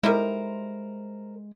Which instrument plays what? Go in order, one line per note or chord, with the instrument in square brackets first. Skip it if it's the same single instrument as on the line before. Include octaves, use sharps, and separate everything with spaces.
[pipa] G3 D#4 E4 [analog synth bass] G#3 [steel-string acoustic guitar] A#4 C5